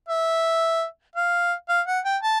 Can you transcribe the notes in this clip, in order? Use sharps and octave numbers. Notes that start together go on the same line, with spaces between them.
E5
F5
F5
F#5
G5
A5